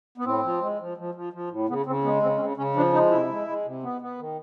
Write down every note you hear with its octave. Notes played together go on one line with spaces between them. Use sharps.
B3
A2 C4
F3
G#3
F3
F3
F3
F3
A2
C#3 B3
C#3 C4
G#3 B3
C#3 C4
C#4
C#3 C4
C#3 C#4
F3 D4
G#3 D#4
C3 E4
G#3
G#3
C3
B3
B3
D#3